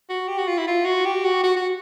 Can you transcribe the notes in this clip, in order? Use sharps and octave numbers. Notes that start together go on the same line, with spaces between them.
F#4
G4
F#4
F4
E4
F4
F#4
G4
F#4
F#4
F#4